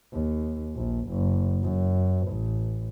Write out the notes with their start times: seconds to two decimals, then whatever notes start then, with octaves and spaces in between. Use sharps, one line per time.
0.12 D#2
0.75 A#1
1.08 F#1
1.63 F#2
2.28 A1